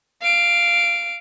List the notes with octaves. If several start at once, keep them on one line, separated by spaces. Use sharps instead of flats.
F5 D7